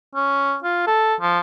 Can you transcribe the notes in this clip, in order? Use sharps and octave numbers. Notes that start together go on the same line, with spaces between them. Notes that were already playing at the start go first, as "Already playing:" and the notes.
C#4
F4
A4
F3